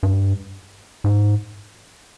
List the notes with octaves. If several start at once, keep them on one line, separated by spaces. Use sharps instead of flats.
G2
G#2